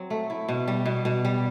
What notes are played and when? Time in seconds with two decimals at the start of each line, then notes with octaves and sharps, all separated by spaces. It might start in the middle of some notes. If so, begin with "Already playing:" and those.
Already playing: F#3 C4
0.10 A3
0.30 E4
0.49 B2
0.68 G3
0.86 B2
1.05 B2
1.25 G3